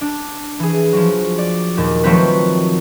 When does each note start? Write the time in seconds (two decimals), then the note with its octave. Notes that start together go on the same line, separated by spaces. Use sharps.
0.01 D4
0.59 E3 G#4
0.93 F3 F#3
1.38 D5
1.77 D#2 A#2
2.04 D#3 F3 F#3 A3 C4 B4